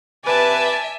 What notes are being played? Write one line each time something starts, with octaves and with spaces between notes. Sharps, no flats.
C3 B4 D5 E5 G#5 A5